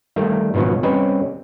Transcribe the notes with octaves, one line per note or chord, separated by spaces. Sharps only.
D#3 G3 A3 A#3
G#2 B2 D#3 F3 F#3
G3 C4 C#4 B4 C5 D#5